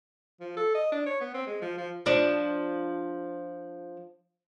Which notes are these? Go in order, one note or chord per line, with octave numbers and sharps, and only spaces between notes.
F3
A4
D#5
D4
C#5
B3
C4
G#3
F3
F3
F3 D4